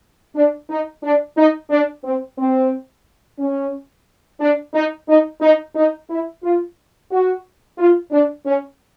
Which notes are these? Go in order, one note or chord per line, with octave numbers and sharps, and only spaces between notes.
D4
D#4
D4
D#4
D4
C4
C4
C#4
D4
D#4
D#4
D#4
D#4
E4
F4
F#4
F4
D4
C#4